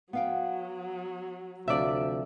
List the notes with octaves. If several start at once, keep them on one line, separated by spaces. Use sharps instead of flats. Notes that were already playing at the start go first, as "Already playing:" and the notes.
F#3 B3 F5 G5
D2 C3 F3 D5 E5